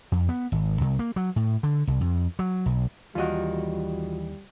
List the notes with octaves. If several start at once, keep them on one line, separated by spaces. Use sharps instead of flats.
F2
B3
G#1
C2
A#3
F#3
A2
D3
C2
F2
F#3
B1
D#2 E3 G3 F4 F#4 D#5